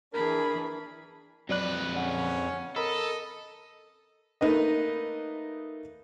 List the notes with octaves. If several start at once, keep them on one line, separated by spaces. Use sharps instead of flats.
E3 D4 G#4 A#4 B5
F2 F#3 B4 D5 F#6
C#4 F#5
A4 A#4 D#5 B5
A3 A#3 D#4 B4 D#5